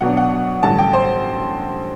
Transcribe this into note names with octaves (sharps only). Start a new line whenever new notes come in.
B1 B2 F#3 B3 D4 F#5
F#5
A1 G2 D3 A5
G5
C5